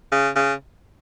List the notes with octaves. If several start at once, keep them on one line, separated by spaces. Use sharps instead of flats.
C#3
C#3